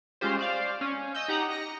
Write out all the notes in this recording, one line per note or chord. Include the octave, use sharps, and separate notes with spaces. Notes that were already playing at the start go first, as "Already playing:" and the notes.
G#3 C#4 F4 G4 C5
C5 D5 F5
C#4
D#5 E6 G6
D#4 G4 F#5 A#5
D#5 A#6 C#7